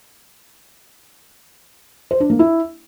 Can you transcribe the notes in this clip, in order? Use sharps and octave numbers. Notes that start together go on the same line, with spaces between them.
C5
D4
A#3
E4